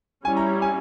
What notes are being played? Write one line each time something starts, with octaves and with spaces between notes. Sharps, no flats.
G3 C#4 E4 G#5
A#5
G#5